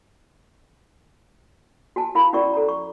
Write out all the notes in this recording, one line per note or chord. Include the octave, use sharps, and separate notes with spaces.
F#4 G#5 A5
E4 A#4 F5 B5
C#4 E4 F#4 A#4 D5 C#6
A4 A#5
C#6